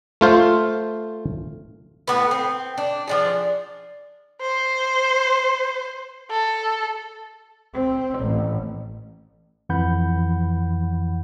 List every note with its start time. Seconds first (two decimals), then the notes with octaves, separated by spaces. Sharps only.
0.21 A3 F4 C5
2.08 A2 B3 B4
2.31 C4
2.78 D4
3.07 F3 D4 G#4
4.41 C5
6.31 A4
7.74 C4
8.20 A1
9.69 F2 E3 F#5 B5 G6